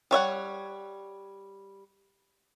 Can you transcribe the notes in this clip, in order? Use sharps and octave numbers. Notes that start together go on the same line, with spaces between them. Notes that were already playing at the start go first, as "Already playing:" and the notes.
G3 C#5 E5 F#5